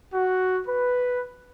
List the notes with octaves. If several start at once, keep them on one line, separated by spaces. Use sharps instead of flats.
F#4
B4